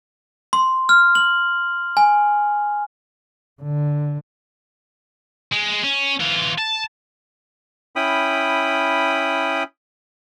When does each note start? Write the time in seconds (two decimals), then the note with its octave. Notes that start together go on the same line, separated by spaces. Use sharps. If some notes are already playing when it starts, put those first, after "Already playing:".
0.53 C6
0.89 F6
1.15 F#7
1.97 G#5
3.62 D3
5.53 G#3
5.84 C#4
6.20 E3 F4
6.58 A5
7.96 C#4 E4 G5 B5 D#6